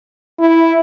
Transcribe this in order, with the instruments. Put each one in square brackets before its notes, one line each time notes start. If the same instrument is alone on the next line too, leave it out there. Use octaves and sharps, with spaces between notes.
[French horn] E4